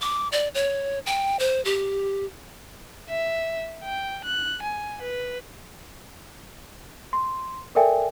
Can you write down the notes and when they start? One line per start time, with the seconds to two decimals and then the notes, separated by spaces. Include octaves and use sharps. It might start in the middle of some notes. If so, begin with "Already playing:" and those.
0.01 D6
0.32 D5
0.54 C#5
1.06 G5
1.39 C5
1.65 G4
3.10 E5
3.84 G5
4.24 F#6
4.62 G#5
5.02 B4
7.13 C6
7.75 A4 A#4 D5 E5 G5 G#5